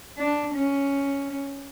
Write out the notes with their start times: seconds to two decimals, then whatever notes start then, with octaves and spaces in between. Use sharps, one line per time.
0.18 D4
0.55 C#4